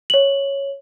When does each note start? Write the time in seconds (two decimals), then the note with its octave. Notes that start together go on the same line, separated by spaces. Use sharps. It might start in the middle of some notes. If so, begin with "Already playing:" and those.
0.10 C#5 F#7